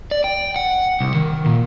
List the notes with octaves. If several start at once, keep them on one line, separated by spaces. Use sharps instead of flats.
D5
G5
F#5
C2
D#3
A#2